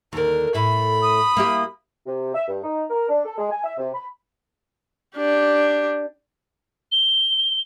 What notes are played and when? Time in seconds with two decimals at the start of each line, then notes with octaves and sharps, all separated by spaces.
0.13 D#2 D3 A#4
0.54 A2 E4 B5
1.02 D#6
1.37 A#3 E4 G4
2.06 C3
2.35 E5
2.48 G2
2.64 D#4
2.90 A#4
3.09 D4
3.25 A4
3.38 G#3
3.52 G#5
3.64 E5
3.78 C3
3.94 B5
5.16 D4 G4
6.92 G7